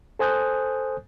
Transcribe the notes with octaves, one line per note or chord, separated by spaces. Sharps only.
A4 C5 G#5 D#6 F#6 G6